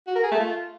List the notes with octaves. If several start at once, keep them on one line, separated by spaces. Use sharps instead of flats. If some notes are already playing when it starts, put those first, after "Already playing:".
F#4
A#4
G#4
A3
F4